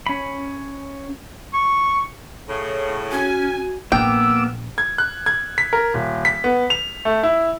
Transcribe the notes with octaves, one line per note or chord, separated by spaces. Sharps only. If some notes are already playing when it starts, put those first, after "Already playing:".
C#4 B5
C#6
A2 C#3
C#4 F#4 G#5
A#1 A#2 A#3 B3 G5 D6 E6
G#6
F#6
G#6
B6
A#4
D#1
B6
B3
F7
A3
E4